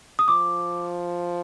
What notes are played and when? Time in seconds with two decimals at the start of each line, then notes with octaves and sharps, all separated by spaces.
0.19 D#6
0.27 F3 D6